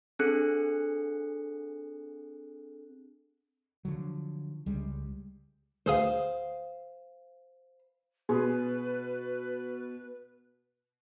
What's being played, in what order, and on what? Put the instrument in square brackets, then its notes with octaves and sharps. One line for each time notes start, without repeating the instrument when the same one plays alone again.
[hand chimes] C4 D4 G#4 A4 F#6 C#7
[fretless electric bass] D3 F3 F#3
C#2 G3 G#3
[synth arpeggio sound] D2 G#4 D#6 [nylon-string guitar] C5 F5
[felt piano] B2 [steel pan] G#4 [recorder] B4